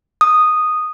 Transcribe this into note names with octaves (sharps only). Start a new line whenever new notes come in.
D#6